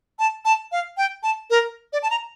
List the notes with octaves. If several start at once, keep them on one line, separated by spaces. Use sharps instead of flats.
A5
A5
F5
G5
A5
A#4
D5
A5
A#5